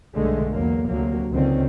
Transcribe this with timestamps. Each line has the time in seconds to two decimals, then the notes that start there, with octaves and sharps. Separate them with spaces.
0.15 B1 G2 D3 G#3 A3
0.52 E2 F#3 A#3
0.87 D2 C3 F#3 A#3
1.33 C#2 D3 D#3 C4 C#4